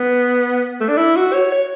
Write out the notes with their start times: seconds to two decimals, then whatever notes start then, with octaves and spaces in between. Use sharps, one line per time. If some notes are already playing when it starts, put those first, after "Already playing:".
Already playing: B3
0.80 A3
0.89 D4
0.97 E4
1.16 F#4
1.33 C#5
1.52 C#5